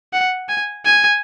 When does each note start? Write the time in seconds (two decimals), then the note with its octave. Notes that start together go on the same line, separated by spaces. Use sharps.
0.13 F#5
0.48 G#5
0.85 G#5